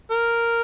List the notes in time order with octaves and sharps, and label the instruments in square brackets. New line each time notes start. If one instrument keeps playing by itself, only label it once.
[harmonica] A#4